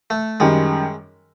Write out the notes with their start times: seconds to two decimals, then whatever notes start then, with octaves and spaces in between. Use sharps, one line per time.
0.10 A3
0.40 F#2 D#3 G3 G#3